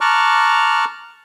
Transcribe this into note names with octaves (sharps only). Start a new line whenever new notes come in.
A5 A#5 C#6 D6 F6 F#6